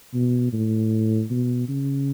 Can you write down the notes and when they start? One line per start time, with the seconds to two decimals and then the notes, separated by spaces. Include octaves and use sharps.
0.14 B2
0.53 A2
1.30 B2
1.69 C#3